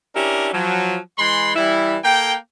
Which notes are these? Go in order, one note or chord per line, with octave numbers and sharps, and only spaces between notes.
C#4 D4 E4 G4 A#4
F3 F#3
E3 G#3 B5 C6
E3 G3 E4
A#3 A4 G5